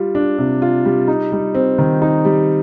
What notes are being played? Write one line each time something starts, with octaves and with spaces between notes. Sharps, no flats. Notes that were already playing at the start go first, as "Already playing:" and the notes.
Already playing: G3 F4
D4
C3
F4
G3
D#4
G3
C4
D#3
D#4
G3